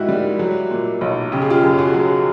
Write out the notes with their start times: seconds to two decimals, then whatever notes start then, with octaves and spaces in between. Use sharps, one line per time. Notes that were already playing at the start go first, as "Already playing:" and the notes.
Already playing: G#2 D#3 E4 F#4 G4
0.09 G3
0.39 F#3
0.71 A#2
1.01 B1
1.32 C#3 G4
1.42 G#4
1.50 F4 G4
1.63 F#2
1.78 F#4 G#4
1.94 F#3